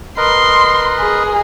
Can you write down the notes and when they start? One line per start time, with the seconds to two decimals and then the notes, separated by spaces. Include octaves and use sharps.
0.17 A#4 B4 D#5 C6
1.00 G#4